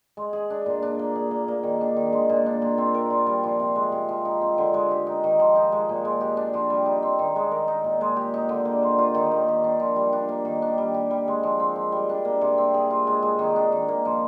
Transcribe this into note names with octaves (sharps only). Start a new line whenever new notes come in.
G#3
G#4
D4
A#2
D4
A#3
G#4
A#3
A#3
D#3
D4
D#3
G#3
A#2
D4
A#2
C4
A#4
F4
G3
F3
C3
G#3
C3
F3
D#4
C4
D3
G#3
G4
D#4
D#3
F3
D#4
G#3
A#2
G#3
G4
D4
F3
G3
D#4
C4
D#3
G#3
A#4
D#4
A#2
G#3
G4
D#4
D3
A#3
C5
F4
D#3
A#3
G4
D4
F3
G3
D4
A#3
D#3
D4
G3
G4
G3
G#3
F3
C4
F3
G3
D4
A#3
C3
C4
G#4
F4
G#3
G#3
D#3
D4
D#3
A#3
F3